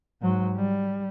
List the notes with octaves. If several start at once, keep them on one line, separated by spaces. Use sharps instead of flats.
G#2 F#3
G3